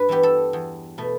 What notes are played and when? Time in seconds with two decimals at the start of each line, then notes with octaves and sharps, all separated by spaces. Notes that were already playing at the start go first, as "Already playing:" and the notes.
Already playing: G2 B4
0.09 E3 B3 G4
0.23 A4
0.53 E2
0.98 B2 A3